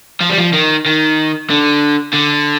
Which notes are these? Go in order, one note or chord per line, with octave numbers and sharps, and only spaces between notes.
F3
G3
F3
D#3
D#3
D3
D3